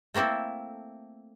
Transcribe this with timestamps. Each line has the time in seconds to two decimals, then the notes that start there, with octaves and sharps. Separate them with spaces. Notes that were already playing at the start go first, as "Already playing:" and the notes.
0.14 A3 A#3 C4 E4 A4